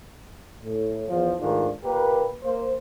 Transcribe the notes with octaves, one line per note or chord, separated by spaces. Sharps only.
A2
E2 F3
G#2 D#3 G#3 A3 D4 F4
A#2 A#3 G4 A#4 B4
A#3 C5